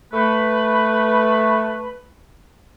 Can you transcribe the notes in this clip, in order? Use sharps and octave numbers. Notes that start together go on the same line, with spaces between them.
A3 B4